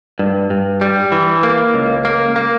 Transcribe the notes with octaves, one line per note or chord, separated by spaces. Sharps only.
G2
G2
G3
E3
A#3
C#2
A#3
A#3